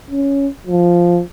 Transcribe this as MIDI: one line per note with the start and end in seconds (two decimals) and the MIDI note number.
0.11 0.48 61
0.67 1.20 53